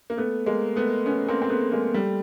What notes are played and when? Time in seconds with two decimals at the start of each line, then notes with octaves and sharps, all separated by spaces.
0.10 A#3
0.17 A3 B3
0.46 G#3 A#3
0.76 A3 B3
1.06 B3 C#4
1.28 A#3 C4
1.42 C4
1.50 A3 B3
1.72 G#3 A#3
1.94 G3 A3